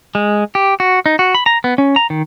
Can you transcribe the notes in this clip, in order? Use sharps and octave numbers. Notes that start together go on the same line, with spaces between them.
G#3
G4
F#4
D#4
F#4
B5
A#5
B3
C#4
A#5
D#3